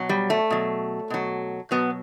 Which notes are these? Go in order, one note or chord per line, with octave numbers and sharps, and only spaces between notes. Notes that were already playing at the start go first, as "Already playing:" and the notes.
Already playing: B2 F#3
G3
A3
B2 F#3
B2 F#3
B2 F#3 B3